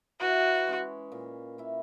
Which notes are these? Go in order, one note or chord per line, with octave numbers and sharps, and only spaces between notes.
E3 F#4
G#3 C#4
A#2
A#3 E4